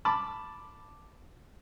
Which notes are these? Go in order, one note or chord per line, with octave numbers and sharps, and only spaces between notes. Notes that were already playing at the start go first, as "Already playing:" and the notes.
A5 B5 D6